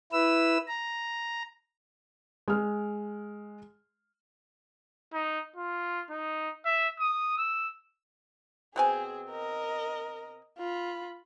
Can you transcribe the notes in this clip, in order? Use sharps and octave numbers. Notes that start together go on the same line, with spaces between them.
E4 B4 E6
A#5
G#3 F6
D#4
F4
D#4
E5
D#6
E6
B2 C4 G#4 G#5
A#4 D#5
F4 B5